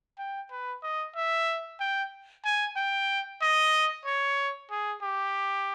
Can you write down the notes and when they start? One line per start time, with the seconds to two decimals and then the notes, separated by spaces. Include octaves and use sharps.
0.18 G5
0.51 B4
0.83 D#5
1.16 E5
1.80 G5
2.45 G#5
2.76 G5
3.42 D#5
4.06 C#5
4.71 G#4
5.02 G4